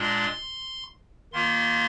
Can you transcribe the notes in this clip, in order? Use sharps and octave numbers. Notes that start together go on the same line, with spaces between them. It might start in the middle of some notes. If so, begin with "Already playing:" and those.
Already playing: A#2 G#3 D4 F4 C6
D#3 A#3 F4 C6